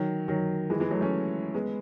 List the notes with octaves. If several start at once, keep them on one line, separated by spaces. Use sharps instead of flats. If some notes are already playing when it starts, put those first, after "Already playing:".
Already playing: D#3 F#3
D#3 F#3
E3 G#3
E3 G#3
F#3 A3
A3 C#4
G#3 B3